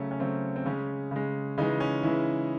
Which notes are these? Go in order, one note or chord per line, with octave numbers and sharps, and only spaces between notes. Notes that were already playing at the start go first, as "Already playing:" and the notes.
Already playing: C#3 F#3 A3 C#4
C#4
C#3 F#3 A3 C4
C4
C#3 G#3 C#4
C#3 G#3
C#3 E3 G#3 D#4
C#4
C#3 E3 G#3 E4